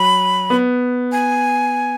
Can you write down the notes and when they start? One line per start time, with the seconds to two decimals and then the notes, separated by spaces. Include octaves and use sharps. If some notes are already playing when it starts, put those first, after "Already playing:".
Already playing: F#3 B5
0.50 B3
1.12 G#5